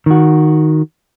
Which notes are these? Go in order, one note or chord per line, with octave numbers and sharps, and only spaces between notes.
D#3 F#4